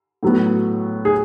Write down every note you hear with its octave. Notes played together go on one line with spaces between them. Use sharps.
A2 F#3 B3
G#4